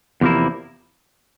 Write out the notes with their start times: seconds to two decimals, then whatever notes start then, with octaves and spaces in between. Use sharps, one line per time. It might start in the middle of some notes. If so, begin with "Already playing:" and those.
0.21 E2 C3 F3 A#3 E4